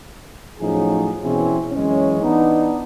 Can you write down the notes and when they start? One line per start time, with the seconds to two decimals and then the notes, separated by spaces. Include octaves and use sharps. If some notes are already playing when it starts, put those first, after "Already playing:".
0.60 A2 F3 F#3 C#4 D#4 G#4
1.22 B2 E3 C4 C#4 E4 G#4
1.72 F#2 E3 G#3 C#4
2.22 E3 B3 D4 D#4